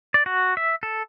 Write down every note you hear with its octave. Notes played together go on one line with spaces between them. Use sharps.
D5
F#4
E5
A4